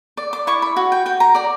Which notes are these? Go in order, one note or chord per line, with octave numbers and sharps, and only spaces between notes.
D5
D6
E4 C#6
B5
F#4
G5
F#4 G5
A#5
D5 A#5